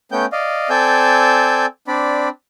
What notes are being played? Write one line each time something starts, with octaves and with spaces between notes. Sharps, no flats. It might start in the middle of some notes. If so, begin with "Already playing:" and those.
A3 B3 C#4 G5 G6
D5 D#5 F5
C4 A4 D5 G#5 E6 G6
C4 D4 D5 B5